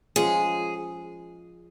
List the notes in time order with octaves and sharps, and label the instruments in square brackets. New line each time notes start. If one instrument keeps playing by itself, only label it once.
[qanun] F3 G#3 C#4 [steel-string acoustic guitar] G#4